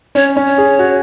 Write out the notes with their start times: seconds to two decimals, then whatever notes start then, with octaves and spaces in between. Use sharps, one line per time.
0.15 C#4 C#5
0.37 C#4
0.47 C#5
0.58 G#4
0.79 F#4